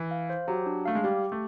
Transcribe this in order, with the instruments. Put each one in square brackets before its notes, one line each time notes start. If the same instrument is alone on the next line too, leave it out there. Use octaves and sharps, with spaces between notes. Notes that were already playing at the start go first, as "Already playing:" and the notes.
Already playing: [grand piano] E3
[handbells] F5
C5
[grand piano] F#3 [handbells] G4
[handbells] D4
[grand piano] A3 [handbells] F5
[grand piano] G#3
[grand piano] G3 [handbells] G4
[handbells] G4
[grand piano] A3